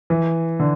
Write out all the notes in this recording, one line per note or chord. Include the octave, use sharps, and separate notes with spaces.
E3
D3